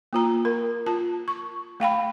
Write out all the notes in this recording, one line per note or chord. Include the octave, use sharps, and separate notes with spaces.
A#3 F4 A#5
A#4
F4 A5
C#6
A3 F5 G5 B5